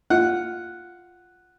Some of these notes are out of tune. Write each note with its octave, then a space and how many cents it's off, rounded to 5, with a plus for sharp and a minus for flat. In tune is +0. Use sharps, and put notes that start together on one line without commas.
F4 +0 F#5 +0